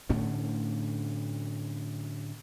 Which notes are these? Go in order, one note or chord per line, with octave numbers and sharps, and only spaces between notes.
A2 D3 A3 C#4